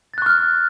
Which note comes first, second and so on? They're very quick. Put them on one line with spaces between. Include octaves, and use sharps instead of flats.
A6 F#6 C#6 F6